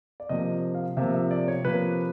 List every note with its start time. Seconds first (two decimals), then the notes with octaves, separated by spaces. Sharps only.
0.20 D5
0.29 C3 F3 A#3 D#5
0.75 F5
0.97 C3 F3 A#3 E5
1.14 E5
1.31 D5
1.48 C#5
1.65 C3 F3 A#3 B4